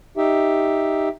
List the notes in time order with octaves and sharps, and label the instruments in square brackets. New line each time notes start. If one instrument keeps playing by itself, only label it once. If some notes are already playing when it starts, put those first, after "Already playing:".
[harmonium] D#4 G4 E5